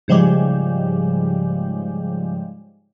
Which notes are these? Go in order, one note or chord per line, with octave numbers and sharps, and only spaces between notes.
G#2 C#3 F3 G3 G#3 G4